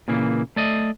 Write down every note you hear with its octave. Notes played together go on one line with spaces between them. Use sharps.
A#2 C#3 E3 A#3
A3 D5 D#5